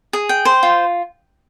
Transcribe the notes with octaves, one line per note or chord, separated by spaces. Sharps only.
G#4
G5
C5
F4